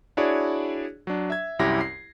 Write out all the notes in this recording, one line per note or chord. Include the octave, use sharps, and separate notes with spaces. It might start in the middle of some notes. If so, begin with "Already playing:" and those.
D4 E4 F#4 G#4 C#5 D5
F#3 D4
E5 G#6
C2 F#2 C#4 E4 G4 A#6
C7